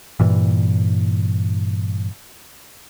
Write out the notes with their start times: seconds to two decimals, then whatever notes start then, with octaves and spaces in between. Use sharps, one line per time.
0.20 G2 A#2 E3